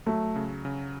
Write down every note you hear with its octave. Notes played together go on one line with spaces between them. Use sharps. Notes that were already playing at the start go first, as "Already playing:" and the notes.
F#3 A3
C#3
C#3